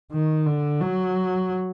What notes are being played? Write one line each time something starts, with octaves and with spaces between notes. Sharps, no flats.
D#3
D3
F#3